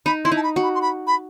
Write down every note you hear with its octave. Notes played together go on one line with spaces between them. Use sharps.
D#4 B5
E4 C6
D#4
A5
B5
F#4
B5
C6
B5
B5